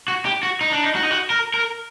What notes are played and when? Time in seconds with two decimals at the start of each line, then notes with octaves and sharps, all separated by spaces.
0.08 F#4
0.25 G4
0.43 F#4
0.61 D#4
0.72 D4
0.83 D#4
0.95 F#4
1.03 D#4
1.11 F#4
1.30 A#4
1.54 A#4